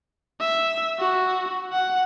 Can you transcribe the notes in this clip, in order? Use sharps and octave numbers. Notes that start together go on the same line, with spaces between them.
E5
F#4
F#5